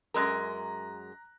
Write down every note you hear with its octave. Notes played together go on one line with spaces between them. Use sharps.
F#2 G#3 A#4 A#5 F#6 A#6